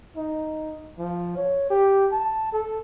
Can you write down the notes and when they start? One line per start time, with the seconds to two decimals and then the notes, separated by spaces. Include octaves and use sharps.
0.16 D#4
0.98 F3
1.37 C#5
1.70 G4
2.12 A5
2.52 A4